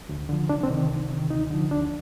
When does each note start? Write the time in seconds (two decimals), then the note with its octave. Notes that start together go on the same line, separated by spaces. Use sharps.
0.09 D2
0.29 D3 F3
0.49 C2 D4
0.63 C4
0.70 C3 D#3
0.91 C2
1.10 C3 D#3
1.30 D2 D#4
1.50 D3 F3
1.71 D2 D4